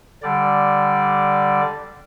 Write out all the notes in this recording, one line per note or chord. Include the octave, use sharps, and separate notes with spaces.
D3 G3 D5